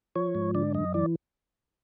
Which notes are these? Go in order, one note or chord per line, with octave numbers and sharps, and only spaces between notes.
F3 C#5
G#2
D3 D5
F#2 D#5
E3 D5